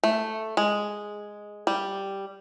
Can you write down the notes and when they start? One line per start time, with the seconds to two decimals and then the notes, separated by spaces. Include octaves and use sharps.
0.04 A3
0.57 G#3
1.67 G3